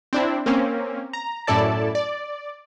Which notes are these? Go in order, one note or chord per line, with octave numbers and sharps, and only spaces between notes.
C4 D4 E4
A#3 C4 C#4
A#5
F#2 A2 E4 A4 D5 A5
D5